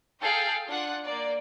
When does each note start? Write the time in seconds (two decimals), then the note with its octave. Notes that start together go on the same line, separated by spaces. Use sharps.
0.21 G#4 A4 F5 G5
0.66 D4 F4 F#5
1.05 A#3 D5